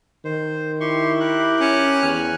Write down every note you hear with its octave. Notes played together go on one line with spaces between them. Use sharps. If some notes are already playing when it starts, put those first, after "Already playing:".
D#3 C5
E4 G4 C6 C#6
G4 A#4 F#6
C#4
E2 G#5 F6 F#6